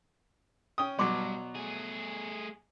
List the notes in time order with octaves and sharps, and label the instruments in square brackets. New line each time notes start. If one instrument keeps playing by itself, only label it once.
[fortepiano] C#4 G5 D#6
[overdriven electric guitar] G2 [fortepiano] B2 F#3 [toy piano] D5 C6 D6
[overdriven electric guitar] A3 G#4